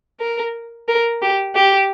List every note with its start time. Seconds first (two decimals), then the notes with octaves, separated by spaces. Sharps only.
0.20 A#4
0.88 A#4
1.22 G4
1.55 G4